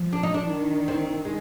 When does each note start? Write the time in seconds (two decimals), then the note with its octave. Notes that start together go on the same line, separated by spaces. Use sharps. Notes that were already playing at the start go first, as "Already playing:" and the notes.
Already playing: F3
0.13 D4
0.23 D#4
0.34 D4
0.50 D#3
0.88 C4
1.25 G#3